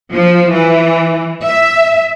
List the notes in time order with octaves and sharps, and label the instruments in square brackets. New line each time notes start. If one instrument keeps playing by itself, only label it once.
[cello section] F3
E3
E5